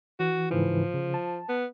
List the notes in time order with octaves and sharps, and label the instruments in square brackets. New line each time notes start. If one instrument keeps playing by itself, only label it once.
[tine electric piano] E3 [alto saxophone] F#4
[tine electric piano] G#2 C#3 E3 [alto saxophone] F3
[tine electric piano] C#3
A5
[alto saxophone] B3